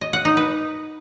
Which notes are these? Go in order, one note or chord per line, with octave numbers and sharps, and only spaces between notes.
D#5
F#5
D#4
B4